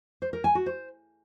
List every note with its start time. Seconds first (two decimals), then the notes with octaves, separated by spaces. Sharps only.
0.22 C5
0.33 A#4
0.44 G#5
0.55 F#4
0.66 C5